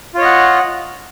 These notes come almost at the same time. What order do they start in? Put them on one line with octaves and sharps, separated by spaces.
F4 C#5 D#5 F#5